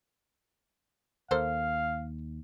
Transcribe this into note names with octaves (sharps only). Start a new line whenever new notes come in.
D#2 A#3 A4 C5 F5